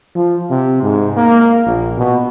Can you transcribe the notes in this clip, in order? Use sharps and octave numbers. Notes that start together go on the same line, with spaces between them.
F3
C3
G#2
A#3
A#1
B2